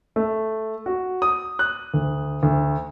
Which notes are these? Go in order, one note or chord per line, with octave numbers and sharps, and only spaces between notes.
A3
F#4
D#6
F#6
D2
D2